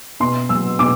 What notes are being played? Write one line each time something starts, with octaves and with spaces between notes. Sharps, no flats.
B2 C6
F#3 E6
B2 D6